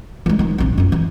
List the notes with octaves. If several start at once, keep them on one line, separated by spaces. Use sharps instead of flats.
E3 G#3
D#3 F3
A#1 C4
F#2 F4
E3